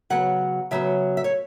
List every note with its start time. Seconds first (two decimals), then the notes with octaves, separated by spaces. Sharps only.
0.10 C#3 F#3 B3 F#5
0.71 C#3 F#3 B3 E5
1.17 E5
1.24 C#5